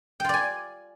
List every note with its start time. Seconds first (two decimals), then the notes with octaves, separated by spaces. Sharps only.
0.20 G5
0.24 F4
0.29 D5
0.34 G#5